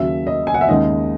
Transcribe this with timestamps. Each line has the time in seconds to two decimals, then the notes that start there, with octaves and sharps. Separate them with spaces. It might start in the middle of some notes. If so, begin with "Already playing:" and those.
Already playing: D#2 C#3 F#3 E5
0.27 D#5
0.47 G#5
0.54 F#5
0.61 E5
0.68 D#2 C#3 G#3 D#4 D#5